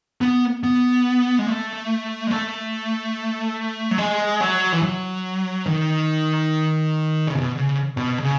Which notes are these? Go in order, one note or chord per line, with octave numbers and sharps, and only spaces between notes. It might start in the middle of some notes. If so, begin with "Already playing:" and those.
B3
B3
G#3
A3
G#3
A3
F#3
G#3
F#3
E3
F#3
D#3
C#3
B2
C#3
B2
C#3